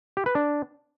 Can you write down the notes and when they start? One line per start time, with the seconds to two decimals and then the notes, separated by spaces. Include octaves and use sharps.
0.17 G4
0.26 B4
0.35 D4